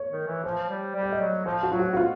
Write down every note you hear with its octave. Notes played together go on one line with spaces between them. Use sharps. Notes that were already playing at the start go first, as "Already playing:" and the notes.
Already playing: C#5
D#3
E3
F3 C5
G3
G3
D5
D#5
F#3
F3 C5
F#4
F#3 F4
F#4
F#4
F4